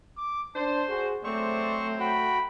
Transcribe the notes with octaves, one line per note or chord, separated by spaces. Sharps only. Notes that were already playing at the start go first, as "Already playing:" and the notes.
D6
D4 C5 A5
F#4 G#4
F#3 A3 C4 C5 D5 C#6
F#4 G5 B5